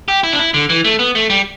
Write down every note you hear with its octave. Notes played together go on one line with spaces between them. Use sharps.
G4
E4
D4
E4
D3
E3
A3
B3
A3
G3